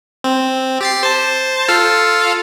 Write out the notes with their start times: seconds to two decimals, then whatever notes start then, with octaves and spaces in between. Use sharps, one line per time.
0.24 C4
0.81 G4 A6 C7
1.03 C5 A5
1.68 F4 A4 F5